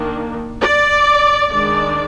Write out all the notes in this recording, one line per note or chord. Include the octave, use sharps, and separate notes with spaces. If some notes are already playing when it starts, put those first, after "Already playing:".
Already playing: D#3 A#3 D4
D5
D#3 G#3 D4 D5